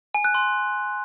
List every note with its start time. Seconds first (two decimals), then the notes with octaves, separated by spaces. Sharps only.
0.14 G#5
0.25 F#6
0.35 C6